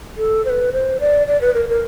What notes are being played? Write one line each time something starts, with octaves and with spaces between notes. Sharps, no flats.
A4
C5
B4
C5
D5
D5
B4
A#4
A#4